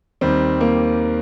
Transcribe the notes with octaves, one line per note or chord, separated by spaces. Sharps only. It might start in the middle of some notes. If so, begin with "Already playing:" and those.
D#2 D#3 G3 C4
A#3